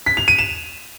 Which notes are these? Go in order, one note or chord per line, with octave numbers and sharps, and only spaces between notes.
B6
F7
D#7
E7